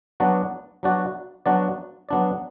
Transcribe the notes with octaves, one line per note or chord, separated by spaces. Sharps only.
F#3 B3 D4 F#4 D5
F#3 B3 D4 F#4 D5
F#3 B3 D4 F#4 D5
F#3 B3 D4 F#4 D5